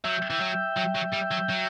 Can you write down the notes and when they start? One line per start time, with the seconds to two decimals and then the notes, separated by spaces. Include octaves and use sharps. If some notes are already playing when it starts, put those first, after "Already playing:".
0.04 F#3 E5 G5
0.30 E3
0.40 F#3
0.77 F#3
0.95 F#3
1.13 G3
1.31 F#3
1.49 F#3